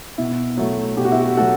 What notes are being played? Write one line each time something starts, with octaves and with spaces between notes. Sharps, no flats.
B2 E4
F#3 A3
B2 G4
F#4
E4
F#4
F#3 A3 F#4 A4